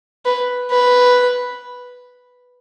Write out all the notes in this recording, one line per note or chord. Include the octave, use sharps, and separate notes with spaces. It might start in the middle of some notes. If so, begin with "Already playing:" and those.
B4
B4